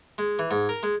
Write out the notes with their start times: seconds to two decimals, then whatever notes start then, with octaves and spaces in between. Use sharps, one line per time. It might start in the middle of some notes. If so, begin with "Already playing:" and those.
0.18 G#3
0.39 E3
0.51 G#2
0.69 A#4
0.83 G#3